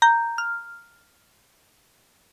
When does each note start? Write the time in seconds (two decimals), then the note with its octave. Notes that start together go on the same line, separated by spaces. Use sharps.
0.02 A#5 G6
0.38 F6